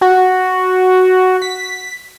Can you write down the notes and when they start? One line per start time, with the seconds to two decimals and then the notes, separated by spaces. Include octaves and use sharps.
0.01 F#4
1.42 B6